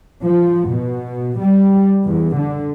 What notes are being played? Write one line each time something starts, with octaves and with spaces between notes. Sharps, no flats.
F3
B2
G3
E2
D3